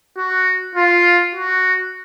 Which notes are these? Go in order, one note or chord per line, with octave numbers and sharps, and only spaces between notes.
F#4
F4
F#4